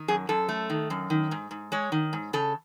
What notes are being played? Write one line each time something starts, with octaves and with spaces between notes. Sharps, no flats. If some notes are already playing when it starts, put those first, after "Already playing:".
Already playing: D#3
F#2 G#4
F#2 A4
A3
D#3
F#2
D#3
G#2
G#2
G#3 C#5
D#3
G#2
C#3 A4